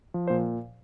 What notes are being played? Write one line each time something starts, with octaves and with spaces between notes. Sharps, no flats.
F3
A#2 C5